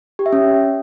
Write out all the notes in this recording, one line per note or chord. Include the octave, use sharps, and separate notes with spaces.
G4
E5
C#4